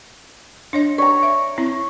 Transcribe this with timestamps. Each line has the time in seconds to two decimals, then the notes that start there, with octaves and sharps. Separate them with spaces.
0.73 D4 C#5 D#5
0.98 C#5 D5 A#5
1.23 E5
1.58 C4 E4